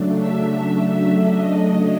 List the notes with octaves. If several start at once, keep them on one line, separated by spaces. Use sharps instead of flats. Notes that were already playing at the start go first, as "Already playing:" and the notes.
Already playing: C#3 F#3 A3 D4
E5
D#5